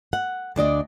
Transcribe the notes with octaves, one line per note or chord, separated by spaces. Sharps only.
F#5
D2 D4 D5 D#5